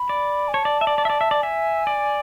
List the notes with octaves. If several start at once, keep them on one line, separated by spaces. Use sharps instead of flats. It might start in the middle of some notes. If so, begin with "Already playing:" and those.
Already playing: B5
D5
G#5
C#5 A5
D5
E5
D5
D5
E5
D5
E5
D5
E5 G#5
D5